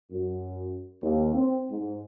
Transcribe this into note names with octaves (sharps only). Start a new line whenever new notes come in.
F#2
D#2
C4
G#2